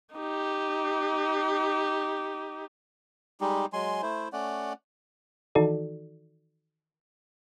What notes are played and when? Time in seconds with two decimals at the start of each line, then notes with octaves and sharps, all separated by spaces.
0.15 D#4 G4
3.41 G3 G#3 D#4 G4
3.73 F#3 G#3 G#5 C6
4.02 A3 E4 C5
4.33 A3 C#4 D5 F#5
5.55 D#3 E3 D#4 F#4 A4 D5